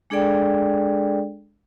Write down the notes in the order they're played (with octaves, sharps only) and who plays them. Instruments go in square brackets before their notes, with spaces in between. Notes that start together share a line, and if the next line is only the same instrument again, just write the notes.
[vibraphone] G#3 D4 G#4 A4 D5 G5